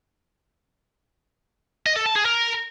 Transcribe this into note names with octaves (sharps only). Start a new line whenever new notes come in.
D#5
A4
A5
G#4
A#4